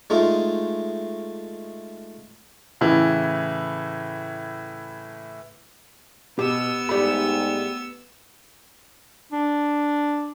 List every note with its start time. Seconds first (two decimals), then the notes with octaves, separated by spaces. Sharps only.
0.10 G#3 A3 D#4 F4
2.81 A2 C#3 E3
6.39 B2 B3 G4 E6
6.89 G#2 G3 A3 G4 B5
9.32 D4